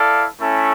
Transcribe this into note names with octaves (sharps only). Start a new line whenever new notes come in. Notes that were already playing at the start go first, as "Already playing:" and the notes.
Already playing: E4 A4 D5 F5
A3 C#4 E4 A4